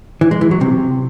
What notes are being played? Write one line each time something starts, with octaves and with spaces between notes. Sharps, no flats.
E3
G#3
E3
F#3
C3